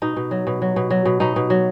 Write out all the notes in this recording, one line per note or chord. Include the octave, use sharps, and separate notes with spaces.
B2 D#4
B2
F#3
B2
F#3
B2
F#3
B2
B2 D#4
B2
F#3